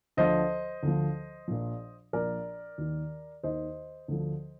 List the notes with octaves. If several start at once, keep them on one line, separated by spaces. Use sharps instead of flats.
D2 D3 F3 C5 D#5
D2 D3 F3
A#1 A#2 F3
A#1 A#2 F3 A#4 D5
D#2 D#3
D#2 D#3 C5 D#5
D2 D3 F3